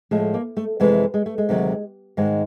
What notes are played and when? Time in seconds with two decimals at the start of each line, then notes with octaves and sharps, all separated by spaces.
0.11 A2 F3 G#3 A3
0.34 A#3
0.57 A3
0.80 F2 C3 E3 G#3 A3
1.14 G#3
1.26 A3
1.38 G#3
1.49 D2 C3 D#3 F#3
2.17 G#2 D#3 G#3